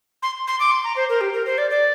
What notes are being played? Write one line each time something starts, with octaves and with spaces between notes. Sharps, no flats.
C6
C6
D6
C6
A#5
C5
A#4
G4
A#4
C5
D5
D5